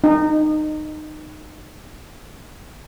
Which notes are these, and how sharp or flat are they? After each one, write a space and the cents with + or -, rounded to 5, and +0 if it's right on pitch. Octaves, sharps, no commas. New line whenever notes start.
D#4 -25